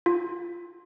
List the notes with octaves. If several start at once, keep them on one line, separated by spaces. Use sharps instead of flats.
F4